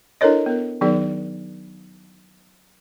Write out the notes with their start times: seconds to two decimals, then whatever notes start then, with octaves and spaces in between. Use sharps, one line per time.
0.21 D4 E4 A4 A#4 C#5 D#5
0.46 B3 A#4
0.81 D#3 F#3 B3 D#4 G#4 D5